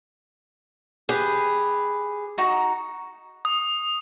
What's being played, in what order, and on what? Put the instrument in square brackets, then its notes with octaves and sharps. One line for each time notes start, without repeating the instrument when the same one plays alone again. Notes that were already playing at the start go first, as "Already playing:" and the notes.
[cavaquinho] G4 B4 [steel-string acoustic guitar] G#4
[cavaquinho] D#4 F#4 A#5
[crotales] D#6